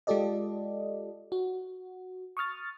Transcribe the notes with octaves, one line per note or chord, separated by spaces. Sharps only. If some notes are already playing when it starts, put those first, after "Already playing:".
G#3 F4 G4 A4 D5 D#5
F#4
C#6 D#6 F6 A6